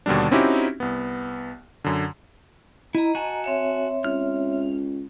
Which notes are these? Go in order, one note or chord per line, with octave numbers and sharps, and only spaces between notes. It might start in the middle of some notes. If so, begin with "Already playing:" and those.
D#2 B2 D3 G3 D4
C4 C#4 D#4 E4 F#4 G4
C2 B3
F#2 D3
E4 D#5 A#5
F#4 G#5 A5
C4 C#5 E5
C#2 F6